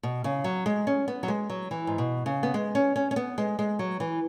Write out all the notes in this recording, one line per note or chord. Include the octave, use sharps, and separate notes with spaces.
B2
C#3
F#3
G#3
C#4
B3
F#3
G#3
F#3
E3
G#2
B2
C#3
B3
G#3
C#4
C#4
C#4
B3
G#3
G#3
F#3
E3